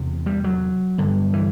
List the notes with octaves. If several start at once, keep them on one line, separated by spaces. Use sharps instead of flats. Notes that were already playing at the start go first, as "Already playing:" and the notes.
Already playing: E2 C3
G3
F#3
G2 D3
E3